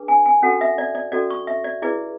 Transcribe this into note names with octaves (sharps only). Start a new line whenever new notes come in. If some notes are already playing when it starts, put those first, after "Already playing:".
Already playing: D4 G#4 B4
G#5
G#5
C#4 F#4 A4 F#5
E5
D5
D5
C#4 F#4 A4 D5
C#6
E5
D5
E4 G#4 B4 D5